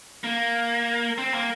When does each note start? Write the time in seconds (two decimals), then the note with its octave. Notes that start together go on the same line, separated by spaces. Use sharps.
0.24 A#3
1.18 C4
1.34 A#3